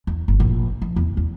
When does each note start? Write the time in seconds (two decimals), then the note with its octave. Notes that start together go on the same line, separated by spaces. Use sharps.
0.07 E2
0.28 G1
0.40 A#1
0.82 F3
0.96 E2
1.17 E2